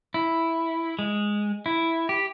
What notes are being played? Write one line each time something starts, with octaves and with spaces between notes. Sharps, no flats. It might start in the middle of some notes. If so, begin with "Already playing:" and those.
E4
G#3
E4
G4